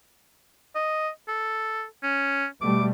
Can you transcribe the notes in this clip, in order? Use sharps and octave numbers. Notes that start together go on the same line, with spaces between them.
D#5
A4
C#4
B2 G3 A3 D6